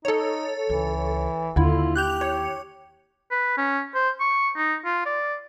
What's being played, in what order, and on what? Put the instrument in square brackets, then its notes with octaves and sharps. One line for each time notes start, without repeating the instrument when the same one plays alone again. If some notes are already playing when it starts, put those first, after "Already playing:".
[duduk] D#4 [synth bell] A4 C#5
[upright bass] C#2 [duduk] E3
[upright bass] D#2 [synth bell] D3 E4 [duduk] F4
[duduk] G4 [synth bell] F#6 G6 F7
[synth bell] C#5
[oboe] B4
C#4
C5
C#6
D#4
F4
D5